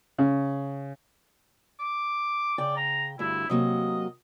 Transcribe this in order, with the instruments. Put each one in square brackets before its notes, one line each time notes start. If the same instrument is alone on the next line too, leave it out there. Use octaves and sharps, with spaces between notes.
[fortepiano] C#3
[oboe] D6
[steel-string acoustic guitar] C#3 G5 [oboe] D5
[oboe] A#5
[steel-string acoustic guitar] D2 G2 [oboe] E4
[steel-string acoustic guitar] C3 F#3 A#3 [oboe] D#5